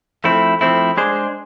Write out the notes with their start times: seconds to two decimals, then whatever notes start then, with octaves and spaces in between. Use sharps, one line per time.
0.24 F3 A3 C4 E4
0.61 F3 A3 C4 E4
0.97 G#3 D4 G#4 C5